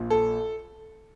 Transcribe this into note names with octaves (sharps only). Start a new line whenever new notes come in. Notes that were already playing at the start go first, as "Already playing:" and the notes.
Already playing: A#1 A#2 F3
A4